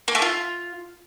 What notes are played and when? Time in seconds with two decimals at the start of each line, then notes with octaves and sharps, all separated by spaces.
0.08 A#3
0.15 A3
0.22 F4